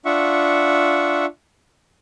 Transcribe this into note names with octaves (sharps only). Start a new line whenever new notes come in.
D4 F4 E5 F#5 C#6